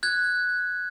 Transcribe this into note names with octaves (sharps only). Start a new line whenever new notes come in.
F#6 G#6